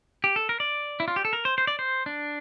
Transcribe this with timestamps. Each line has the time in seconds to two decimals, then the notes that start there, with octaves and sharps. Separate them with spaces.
0.24 G4
0.36 A4
0.49 A#4
0.60 D5
1.00 E4
1.08 F4
1.16 G4
1.25 A4
1.33 A#4
1.45 C5
1.58 C5
1.67 D5
1.79 C5
2.06 D4